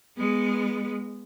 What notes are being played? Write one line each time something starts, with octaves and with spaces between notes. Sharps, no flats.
G#3 B3